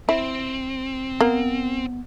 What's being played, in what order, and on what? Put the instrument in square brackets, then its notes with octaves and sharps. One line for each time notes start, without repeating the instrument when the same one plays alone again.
[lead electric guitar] C4 [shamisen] E4
[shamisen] A#3 [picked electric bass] B3